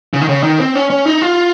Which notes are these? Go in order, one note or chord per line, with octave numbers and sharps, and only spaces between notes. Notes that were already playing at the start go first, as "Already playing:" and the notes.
C#3
D#3
C#3
D#3
C4
C#4
C#4
D#4
F4